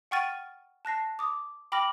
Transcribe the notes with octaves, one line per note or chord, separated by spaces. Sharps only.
F#5 G5 C#6 F6 A6 D#7
A5 F#6 A#6 C7
D6 D#6
G5 B5 D6 F6 A#6 F#7